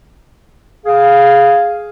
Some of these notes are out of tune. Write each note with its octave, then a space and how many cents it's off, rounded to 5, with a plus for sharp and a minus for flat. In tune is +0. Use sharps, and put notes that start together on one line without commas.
G#4 +0 F5 +0